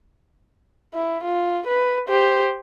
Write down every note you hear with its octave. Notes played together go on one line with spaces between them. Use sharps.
E4
F4
B4
G4 C5